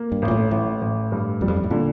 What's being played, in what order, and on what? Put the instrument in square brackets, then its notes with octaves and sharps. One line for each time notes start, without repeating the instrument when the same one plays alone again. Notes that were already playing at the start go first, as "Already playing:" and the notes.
Already playing: [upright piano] A#3
[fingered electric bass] G2
[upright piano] A1
[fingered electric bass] A#2
A2
[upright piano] A1 [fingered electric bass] A2
[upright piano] A1
G2
[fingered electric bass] E2 [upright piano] G3
[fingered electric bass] F2
G2
A2
[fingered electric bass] A#2 [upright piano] D3